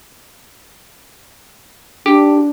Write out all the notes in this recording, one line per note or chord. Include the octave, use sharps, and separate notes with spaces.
D4 G4